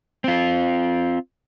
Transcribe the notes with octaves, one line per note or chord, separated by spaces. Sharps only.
C4 F4